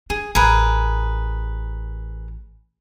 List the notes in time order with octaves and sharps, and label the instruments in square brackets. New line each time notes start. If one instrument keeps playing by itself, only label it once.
[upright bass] D4 [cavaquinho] G#4
[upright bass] A1 [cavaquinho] G#4 A#4 B4